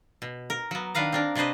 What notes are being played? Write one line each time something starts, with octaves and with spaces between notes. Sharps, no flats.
B2
A#4
F#3 B3
D#3 D4 B4 F5 A#5
C4 D4 A#4
C3 D4 B4 C5 D#5